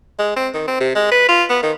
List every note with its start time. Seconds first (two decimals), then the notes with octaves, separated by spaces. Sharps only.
0.19 G#3
0.36 C4
0.54 D#3
0.67 C4
0.80 C3
0.95 G#3
1.11 B4
1.28 F4
1.50 B3
1.63 D#3